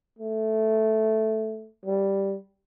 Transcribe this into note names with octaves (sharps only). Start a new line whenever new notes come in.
A3
G3